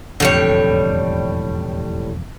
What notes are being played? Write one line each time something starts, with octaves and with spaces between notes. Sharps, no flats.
E1 F2 A2 D3 G3 C#5